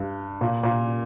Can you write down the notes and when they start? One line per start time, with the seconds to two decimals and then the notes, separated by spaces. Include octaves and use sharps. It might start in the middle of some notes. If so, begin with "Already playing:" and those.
Already playing: G2
0.41 A#2
0.63 A#2